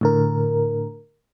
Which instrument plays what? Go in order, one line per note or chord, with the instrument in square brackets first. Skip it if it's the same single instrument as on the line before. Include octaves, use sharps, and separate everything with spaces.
[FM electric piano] A2 D3 A#4